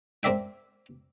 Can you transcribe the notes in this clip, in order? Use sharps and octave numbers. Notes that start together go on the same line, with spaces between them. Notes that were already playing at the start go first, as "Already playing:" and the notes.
C4 A#4 D5 E5 G5